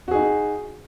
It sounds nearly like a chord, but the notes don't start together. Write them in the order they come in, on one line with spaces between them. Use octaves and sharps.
F#4 G#4 D#4